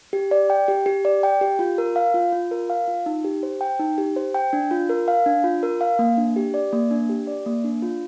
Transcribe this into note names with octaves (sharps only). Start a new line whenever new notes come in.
G4
D5
G5
G4
G4
D5
G5
G4
F4
A#4
F5
F4
F4
A#4
F5
F4
D#4
G4
C5
G5
D#4
G4
C5
G5
D4
F4
A#4
F5
D4
F4
A#4
F5
A#3
D4
G4
D5
A#3
D4
G4
D5
A#3
D4
F4